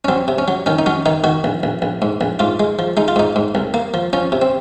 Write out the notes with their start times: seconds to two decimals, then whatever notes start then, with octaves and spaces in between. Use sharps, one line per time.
0.05 C#4
0.08 F#3 C4
0.28 C3
0.38 C#4
0.48 F#3
0.66 D#3 C#4
0.79 D#4
0.86 F#3 C#4
1.06 D#3 D#4
1.24 D#3 F#4
1.44 A#1
1.63 A#1
1.82 A#1
2.02 G#2
2.21 A#1
2.39 G#2 F4
2.60 G#3
2.79 F3
2.97 G#3 D#4
3.08 F4
3.16 G#2 D#4
3.36 G#2
3.55 C2
3.74 A#3
3.94 F3
4.13 F3 C#4
4.32 C3
4.42 C4